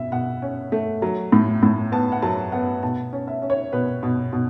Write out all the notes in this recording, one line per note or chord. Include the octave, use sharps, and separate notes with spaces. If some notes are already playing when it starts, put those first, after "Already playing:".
Already playing: B2 E5
B2 F#5
C#4
A3
F#3
A2
A2
B3 A5
F#5
F#3 A5
B3 F#5
B2 A5
C#4
E5
C#4
C#5
B2 B4
B2
B2